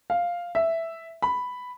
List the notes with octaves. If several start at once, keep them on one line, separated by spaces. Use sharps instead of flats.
F5
E5
B5